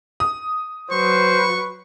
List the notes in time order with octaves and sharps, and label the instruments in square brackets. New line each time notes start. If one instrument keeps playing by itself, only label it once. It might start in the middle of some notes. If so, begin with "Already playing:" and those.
[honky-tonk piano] D#6
[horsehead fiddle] F#3 B4 [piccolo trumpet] C5 [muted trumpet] C#6